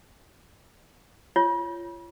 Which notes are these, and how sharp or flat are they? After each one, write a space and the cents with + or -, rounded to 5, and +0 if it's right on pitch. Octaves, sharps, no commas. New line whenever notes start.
F4 -30 C#5 +0